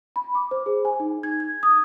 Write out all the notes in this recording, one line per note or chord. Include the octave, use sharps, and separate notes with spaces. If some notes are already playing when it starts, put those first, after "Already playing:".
B5
D6
C5
G#4
G#5
D#4
G#6
G#6
D#6